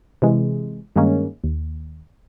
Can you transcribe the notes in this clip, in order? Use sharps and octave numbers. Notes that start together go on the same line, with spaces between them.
C3 E3 G#3
G2 D#3 G#3 A#3 C#4
D#2